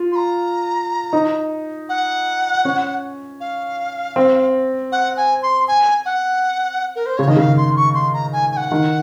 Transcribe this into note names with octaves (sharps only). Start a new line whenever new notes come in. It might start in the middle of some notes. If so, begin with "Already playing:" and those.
Already playing: F4
C6
A#5
D#4
F#5
C#4
F5
C4
F#5
G#5
C6
G#5
F#5
A#4
C5
C#3 C#5
D#3 D#5
C#3 F5
C6
C#6
C6
A#5
G#5
G#5
F#5
D#3